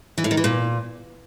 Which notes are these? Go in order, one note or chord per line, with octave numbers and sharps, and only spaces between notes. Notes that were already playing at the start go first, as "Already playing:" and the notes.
E3
A2
D#3
E3
A#2